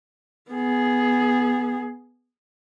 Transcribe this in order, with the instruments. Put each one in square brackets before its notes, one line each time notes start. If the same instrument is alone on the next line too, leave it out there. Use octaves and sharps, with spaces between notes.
[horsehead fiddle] B3 G#4